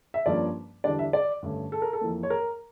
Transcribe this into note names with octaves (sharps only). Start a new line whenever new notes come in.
E5
G2 F3 A#3 C#4 D5
E2 D3 G3 D4 D5
E5
D5
G2 D3 A3 C#4
A4
A#4
A4
F2 E3 A#3
C#5
A#4